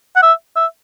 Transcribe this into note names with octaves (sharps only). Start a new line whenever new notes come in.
F#5
E5
E5